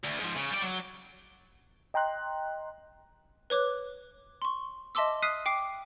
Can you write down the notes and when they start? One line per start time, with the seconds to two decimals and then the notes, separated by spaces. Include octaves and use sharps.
0.04 D2
0.20 G#2 F3
0.36 C#3
0.50 G3 D5
0.62 F#3
1.94 D#5 G5 A#5 C6 F#6
3.50 B4 C#5 D6 F#6
4.42 C6 C#6
4.95 D#5 E5 A5 C6 D6 E6
5.22 D#6 F6 F#6 B6 C7 D#7
5.46 G5 D6 C7